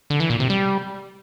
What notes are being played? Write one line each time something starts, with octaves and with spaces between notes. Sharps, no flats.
D3
E3
A#2
C3
G3